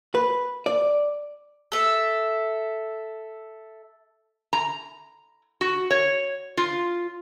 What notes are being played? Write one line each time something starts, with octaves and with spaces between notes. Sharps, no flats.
B4
D5
A4 E5
A#5
F#4
C#5
F4